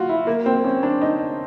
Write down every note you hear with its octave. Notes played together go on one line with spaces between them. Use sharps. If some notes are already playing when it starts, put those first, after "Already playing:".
Already playing: F4 F#4
E4
A#3
C4
C#4
D4
D#4